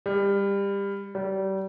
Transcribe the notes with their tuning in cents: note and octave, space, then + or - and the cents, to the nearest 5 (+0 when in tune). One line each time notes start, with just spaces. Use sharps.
G3 +25
G3 -30